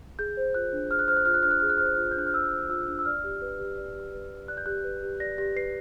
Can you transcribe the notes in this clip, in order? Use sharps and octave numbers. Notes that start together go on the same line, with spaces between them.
G#4 G6
C5
F4 F#6
D4
G#4 F6
F#6
C5 F6
F#6
F4 F6
F#6
D4 F6
F#6
G#4 F6
F#6
C5 F6
F#6
F4 F6
G6
D4 F#6
F6
G#4 E6
C5
F4 E6
D4
E6
D5 F6
G4
B4
G4
D5
G4
B4
G4
D5 F#6
G6
G4 F#6
B4
G4
D5 A#6
G4 A#6
B4 C7